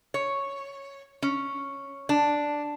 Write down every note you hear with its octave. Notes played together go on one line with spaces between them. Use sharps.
C#5
C#4
D4